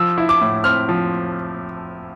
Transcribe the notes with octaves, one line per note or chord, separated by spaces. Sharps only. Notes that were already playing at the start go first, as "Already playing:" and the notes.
Already playing: F3 E6
E4
D6
A2
C4 F6
F3